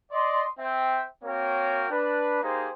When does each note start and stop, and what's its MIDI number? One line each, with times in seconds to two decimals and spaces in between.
0.11 0.44 74
0.11 0.44 75
0.11 0.44 84
0.59 1.02 60
0.59 1.02 72
0.59 1.02 76
0.59 1.02 79
1.24 1.86 58
1.24 1.86 60
1.24 1.86 66
1.24 1.86 70
1.24 1.86 73
1.24 1.86 79
1.90 2.38 62
1.90 2.38 71
2.42 2.68 58
2.42 2.68 63
2.42 2.68 67
2.42 2.68 68
2.42 2.68 72